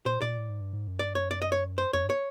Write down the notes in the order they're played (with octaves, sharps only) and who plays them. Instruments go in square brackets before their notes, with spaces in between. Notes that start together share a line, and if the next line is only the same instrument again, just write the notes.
[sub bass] A#2 [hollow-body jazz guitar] C5
[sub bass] A#2 [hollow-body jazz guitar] D5
[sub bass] A2
G#2
G2
G#2
F#2
[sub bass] G2 [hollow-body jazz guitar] D5
[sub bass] F#2 [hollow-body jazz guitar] C#5
[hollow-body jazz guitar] D5
D#5
C#5
C5
[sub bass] F2 [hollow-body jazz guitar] C#5
[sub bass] G2
[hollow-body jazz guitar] C#5